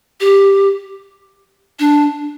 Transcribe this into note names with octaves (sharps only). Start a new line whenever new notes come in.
G4
D4